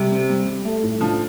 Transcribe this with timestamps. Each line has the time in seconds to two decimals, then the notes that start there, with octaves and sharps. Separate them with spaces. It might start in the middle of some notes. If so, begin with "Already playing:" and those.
Already playing: C3 G3
0.11 C4
0.30 G3
0.48 G3
0.65 A3
0.83 A2
1.01 F3 D4